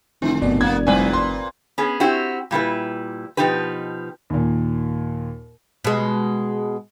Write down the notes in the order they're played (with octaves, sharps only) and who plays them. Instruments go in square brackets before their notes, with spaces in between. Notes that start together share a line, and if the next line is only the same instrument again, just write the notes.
[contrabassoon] F1 [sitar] D3 [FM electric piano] C4 E4 C6
[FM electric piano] G1 D5 [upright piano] B2
[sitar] A#3 B3 [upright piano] G#6
[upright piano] C2 G#5 [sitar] A#2 C4 B4
[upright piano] C6
[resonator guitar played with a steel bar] B3 C#4 G#4
C4 E4 F#4 G4
A#2 G3 E4 B4
B2 F3 D#4 G4 B4
[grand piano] D#2 A#2
[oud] B2 G#3